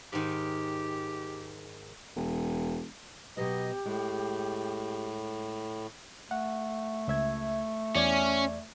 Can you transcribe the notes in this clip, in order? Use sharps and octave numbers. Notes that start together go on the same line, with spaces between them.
G#2 D#3 G4
E1
B2 F#3 B3 G4 D#5
A2 G#3
A3 F#5
C#2 E5 G#6
E2 C#4 D5 G#6